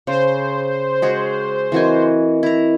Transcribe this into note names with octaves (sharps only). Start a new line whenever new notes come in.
C#3 C5
G#3 F#4 G#4
E3 C4 F#4 A#4 D#5 G#5
E4 A#5